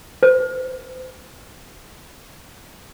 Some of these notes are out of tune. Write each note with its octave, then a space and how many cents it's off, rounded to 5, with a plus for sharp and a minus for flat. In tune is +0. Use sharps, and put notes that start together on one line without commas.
C5 -35